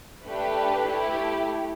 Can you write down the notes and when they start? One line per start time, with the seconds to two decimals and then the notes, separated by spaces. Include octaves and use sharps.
0.24 A3 D4 G4 B4
0.87 A3 E4 G4